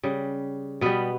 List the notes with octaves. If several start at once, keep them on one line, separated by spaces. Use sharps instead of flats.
C#3 G3
B2 G3 B3